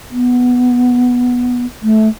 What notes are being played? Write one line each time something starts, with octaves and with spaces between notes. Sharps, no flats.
B3
A3